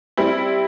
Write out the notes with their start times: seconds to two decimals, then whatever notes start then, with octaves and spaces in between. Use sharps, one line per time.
0.17 G3 C4 E4